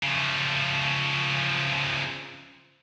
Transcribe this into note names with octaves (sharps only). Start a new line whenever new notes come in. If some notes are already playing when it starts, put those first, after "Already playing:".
C#3 F3